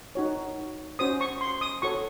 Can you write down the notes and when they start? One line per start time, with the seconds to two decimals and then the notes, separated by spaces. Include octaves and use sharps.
0.15 D#4 F#4 C#5
0.99 C#4 F#4 C5 D#6
1.21 C#6
1.41 C6
1.61 D#6
1.82 F#4 A4 C#5 C#6